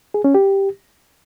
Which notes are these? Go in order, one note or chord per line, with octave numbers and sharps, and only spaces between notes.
G#4
C#4
G4